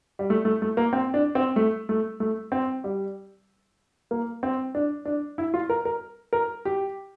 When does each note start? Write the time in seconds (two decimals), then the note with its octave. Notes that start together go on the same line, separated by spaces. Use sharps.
0.19 G3
0.30 A3
0.45 A3
0.62 A3
0.77 A#3
0.93 C4
1.14 D4
1.35 C4
1.56 A3
1.89 A3
2.20 A3
2.52 C4
2.84 G3
4.11 A#3
4.43 C4
4.75 D4
5.05 D4
5.38 E4
5.54 F4
5.70 A#4
5.85 A#4
6.33 A#4
6.65 G4